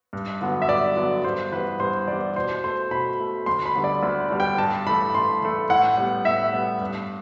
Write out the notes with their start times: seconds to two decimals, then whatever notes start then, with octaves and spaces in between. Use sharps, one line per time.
0.13 G2
0.41 D3 F#3 B3
0.62 E5
0.69 G2 D5
0.96 D3 F#3 B3
1.24 G2 C5
1.52 E3 G3 B3 B4
1.80 G2 C5
2.07 E3 G3 B3 D5
2.36 B2 C5
2.64 A3 C5
2.91 B2 B5
3.20 A3
3.46 D2 C6
3.66 B5
3.75 D3 G3 B3
3.84 D5
4.03 D2
4.30 D3 G3 B3
4.40 G5
4.58 G2 A5
4.87 E3 A3 B5
5.14 G2 C6
5.42 E3 A3
5.70 A2 F#5
5.98 G3 B3
6.25 A2 E5
6.53 G3 B3
6.81 G2